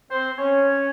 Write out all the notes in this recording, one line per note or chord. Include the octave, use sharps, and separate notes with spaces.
C4 C5
C#4 C#5